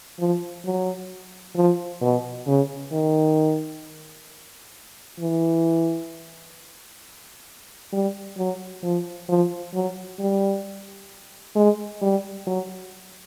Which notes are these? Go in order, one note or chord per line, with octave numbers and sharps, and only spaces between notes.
F3
F#3
F3
B2
C#3
D#3
E3
G3
F#3
F3
F3
F#3
G3
G#3
G3
F#3